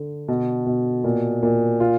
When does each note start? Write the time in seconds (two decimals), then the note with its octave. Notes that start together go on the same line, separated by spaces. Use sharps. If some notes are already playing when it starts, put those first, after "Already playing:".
Already playing: D3 D4
0.28 B2
0.66 B2
1.04 A#2
1.43 A#2
1.80 F4